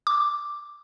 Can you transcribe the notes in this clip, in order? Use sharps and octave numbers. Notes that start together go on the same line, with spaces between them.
D6